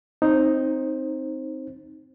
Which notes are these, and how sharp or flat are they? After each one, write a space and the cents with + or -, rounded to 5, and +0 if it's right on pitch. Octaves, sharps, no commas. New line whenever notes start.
C4 +0 D#4 +0 C5 +20